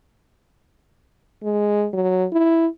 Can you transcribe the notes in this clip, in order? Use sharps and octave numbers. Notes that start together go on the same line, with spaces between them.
G#3
F#3
E4